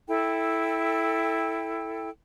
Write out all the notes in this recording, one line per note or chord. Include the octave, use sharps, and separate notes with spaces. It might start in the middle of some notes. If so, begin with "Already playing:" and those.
E4 A4 G5